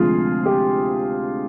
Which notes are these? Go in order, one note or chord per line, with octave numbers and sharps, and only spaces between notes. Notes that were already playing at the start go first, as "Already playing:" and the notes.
Already playing: D2 C3 F3 G#3 F4 G#4
G4